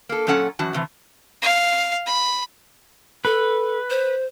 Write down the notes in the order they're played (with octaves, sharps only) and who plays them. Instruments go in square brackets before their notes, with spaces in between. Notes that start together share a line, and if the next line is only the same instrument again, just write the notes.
[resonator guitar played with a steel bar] A#3 A4
A#2 F#3 C#4 A4 F#5
F#2 E3 F#4 A5
A2 C3 E3
[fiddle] F5
B5
[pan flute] A4 [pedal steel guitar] B4
[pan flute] C5